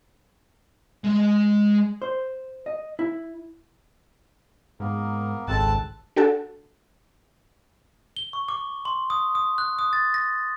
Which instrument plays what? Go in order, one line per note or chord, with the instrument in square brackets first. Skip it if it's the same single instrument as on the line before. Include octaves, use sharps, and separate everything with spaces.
[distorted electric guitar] G#3 D#5
[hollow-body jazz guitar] C5
D#5
E4
[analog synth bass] G#2 [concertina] A#3 B3 A#4
[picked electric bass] G#1 [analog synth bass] C#2 [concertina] C4 A4 F#6 [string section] A5
[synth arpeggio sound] D4 F#4 A4 F#5 A5
[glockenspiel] G7
C#6
D6
C6
D#6
D#6
F#6
D#6
A6
A#6